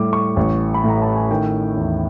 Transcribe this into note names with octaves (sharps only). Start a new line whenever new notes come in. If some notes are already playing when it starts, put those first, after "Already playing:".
Already playing: A2 G3 D6
C#6
A1
B5
A2 A#5
A5
G#5
D#3 G5
E2